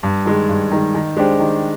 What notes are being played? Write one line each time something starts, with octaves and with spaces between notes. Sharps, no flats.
G2
D#3 G#3
G2
D#3 G#3
D#3
G#3 D4 G4 C5
D#3